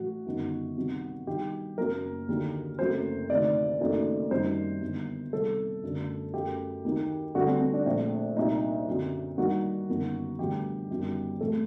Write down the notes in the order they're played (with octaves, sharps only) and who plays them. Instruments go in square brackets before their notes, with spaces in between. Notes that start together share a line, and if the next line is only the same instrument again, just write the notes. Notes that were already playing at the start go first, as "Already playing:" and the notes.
Already playing: [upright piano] A1 A2 F#3 F#4
G1 F#2 D#3
C2 C3 D#3 F#3
G2 D#3 F#3 G4
F#1 F#2 F#3 A#3 A#4
D#2 D3 F#3
F#1 F#2 F#3 A3 C4 C5
D2 C3 D#3 D5
F#1 F#2 D#3 A3 C4
F#2 D#3 G3 C4 C5
G1 G2 D#3
C2 C3 D#3 G3 C4 A4
F#2 D3 A3
F#2 F#3 A3 G4
D#2 D#3 F#3 A#3
G2 D3 A3 C4 F#4
C4
C4
D4
A#1 A2 A3 C4
C2 A#2 F#3 D#4
F#2 D3 F#3 C4
G2 D#3 G3 A#3 F#4
G1 F#2 D#3 F#3 A#3
A1 G2 D3 F#3 A3 G4
G1 F#2 D#3 G3
A1 A2 A3 C4 A4